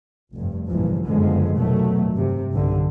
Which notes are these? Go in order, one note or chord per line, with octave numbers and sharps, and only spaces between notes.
F1 G2
G#1 C#2 G2 A#2 E3 F3
F#1 G2 D3 F3 G#3 B3
F1 B2 D#3 F#3 A3
G2 C3
B1 G2 D3